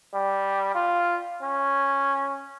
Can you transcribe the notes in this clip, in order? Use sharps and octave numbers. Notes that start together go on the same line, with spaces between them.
G3
F4
C#4